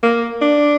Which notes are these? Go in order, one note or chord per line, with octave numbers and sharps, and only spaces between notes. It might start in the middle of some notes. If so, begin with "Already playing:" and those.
A#3
D4